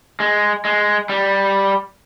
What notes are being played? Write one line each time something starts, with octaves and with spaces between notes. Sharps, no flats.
G#3
G#3
G3